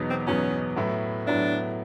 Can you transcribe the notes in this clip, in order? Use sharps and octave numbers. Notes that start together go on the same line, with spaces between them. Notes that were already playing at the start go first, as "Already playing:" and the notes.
Already playing: E2 B2 F#3 B3 D#4
C4
E2 B2 F#3 B3 C#4 D#4
A2 F#3 B3 E4
A2 F#3 B3 D4 E4